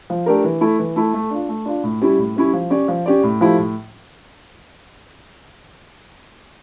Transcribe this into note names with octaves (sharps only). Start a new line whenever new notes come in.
F3
A3 D4 G4 A#4
E3
A3 E4 A4
E3
A3 E4 A4
A3
D4 F4
A3
D4 F4
A2
G3 C#4 E4
A2
G3 C#4 E4
F3
C#4 G4 D5
F3
C#4 G4 D5
A2
F3 A3 E4 G4
A2